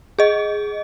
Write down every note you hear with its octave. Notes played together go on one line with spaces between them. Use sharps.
G#4 D#5